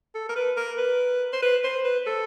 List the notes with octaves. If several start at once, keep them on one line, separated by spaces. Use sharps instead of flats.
A4
A#4
B4
A#4
B4
C5
B4
C5
B4
A4